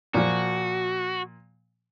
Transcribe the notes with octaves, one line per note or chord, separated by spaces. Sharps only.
A#2 F3 F#4